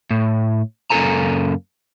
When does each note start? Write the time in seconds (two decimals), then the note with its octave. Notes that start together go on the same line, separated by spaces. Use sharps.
0.11 A2
0.90 F#2 C#3 A#3 A4 G#5 A#5